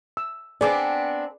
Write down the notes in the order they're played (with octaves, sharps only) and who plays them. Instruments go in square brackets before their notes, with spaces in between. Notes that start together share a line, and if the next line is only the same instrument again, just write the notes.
[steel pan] E6
[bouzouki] B3 C4 D4 [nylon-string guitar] G#4 B4 [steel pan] D5 D6